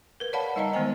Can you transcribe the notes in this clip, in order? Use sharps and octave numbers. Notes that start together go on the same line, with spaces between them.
A#4 B4
C#5 D5 F5 F#5 A5 B5
G3 D#4 D#5 F5 A#5
D#3 G#3 B3 C5 G5 G#5